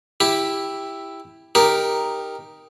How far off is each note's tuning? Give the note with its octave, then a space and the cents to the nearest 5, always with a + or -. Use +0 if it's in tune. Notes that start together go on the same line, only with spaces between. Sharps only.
E4 +0 G4 +10
D#4 +0 G4 +10 A#4 +0